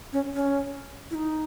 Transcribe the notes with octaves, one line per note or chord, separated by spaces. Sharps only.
C#4
C#4
E4
D#4